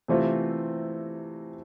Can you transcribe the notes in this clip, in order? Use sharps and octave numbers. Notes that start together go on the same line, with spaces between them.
C3 E3 A3 C4 F4